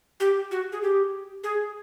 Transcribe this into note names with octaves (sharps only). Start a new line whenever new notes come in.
G4
F#4
G#4
G4
G#4